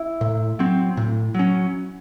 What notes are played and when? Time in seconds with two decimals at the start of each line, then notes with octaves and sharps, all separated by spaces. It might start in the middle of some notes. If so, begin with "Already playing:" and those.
Already playing: E4
0.21 A2
0.59 F#3 C4
0.97 A2
1.34 F#3 C#4